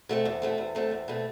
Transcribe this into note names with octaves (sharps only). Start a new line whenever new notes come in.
B2 A3 C4
E2
B2 A3 C4
E2
B2 A3 C4
E2
B2 A3 C4